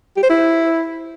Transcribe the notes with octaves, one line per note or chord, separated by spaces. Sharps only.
G4
C5
E4